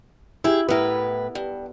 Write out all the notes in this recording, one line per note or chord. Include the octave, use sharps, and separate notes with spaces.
E4 G4 G#4
A2 B3 E4 A#4 B4
G2